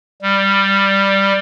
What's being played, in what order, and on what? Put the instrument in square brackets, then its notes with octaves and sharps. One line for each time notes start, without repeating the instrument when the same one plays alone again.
[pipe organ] G3